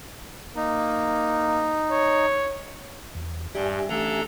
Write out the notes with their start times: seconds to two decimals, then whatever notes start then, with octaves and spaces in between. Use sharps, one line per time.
0.56 A#3 D#4
1.91 C#5
3.15 E2
3.55 G2 G3 G4 E5 G#5
3.89 A1 D4 A4 A#5